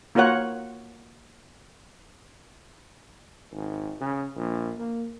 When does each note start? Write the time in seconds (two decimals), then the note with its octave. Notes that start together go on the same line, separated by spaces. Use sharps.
0.15 A#3 F4 F#4 A#4 C#5 F#5
3.53 G#1
4.01 C#3
4.36 A#1
4.78 A#3